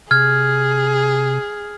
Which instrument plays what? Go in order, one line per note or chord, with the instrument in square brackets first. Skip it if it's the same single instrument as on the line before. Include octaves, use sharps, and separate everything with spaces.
[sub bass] C3 [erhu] G#4 [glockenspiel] F6 G#6